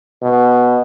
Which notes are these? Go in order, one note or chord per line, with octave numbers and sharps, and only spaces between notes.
B2